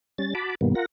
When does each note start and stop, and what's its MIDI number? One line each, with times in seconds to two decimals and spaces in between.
0.18 0.34 55
0.18 0.34 61
0.18 0.34 93
0.35 0.55 66
0.35 0.55 81
0.35 0.55 83
0.35 0.55 86
0.61 0.75 43
0.61 0.75 47
0.61 0.75 51
0.61 0.75 55
0.61 0.75 58
0.61 0.75 59
0.75 0.86 65
0.75 0.86 70
0.75 0.86 78
0.75 0.86 94